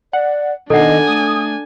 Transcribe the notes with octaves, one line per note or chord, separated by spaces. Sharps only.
D5 F#5
B2 D#3 D4 A4 D#5 F#5 G#5
A3 D#6